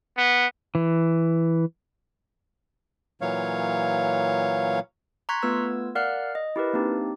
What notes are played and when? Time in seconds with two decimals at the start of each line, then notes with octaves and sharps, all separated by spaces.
0.17 B3
0.75 E3
3.21 A#2 E3 F#3 C#5 F5
5.29 A#5 C6 C#6 F#6 G#6 B6
5.42 A3 B3 F4 B4 E6 G#6
5.95 A#4 D5 F5 F#5 F6 F#6
6.35 D#5
6.56 E4 G4 A#4 B4
6.73 A#3 C4 D4 D#4 G4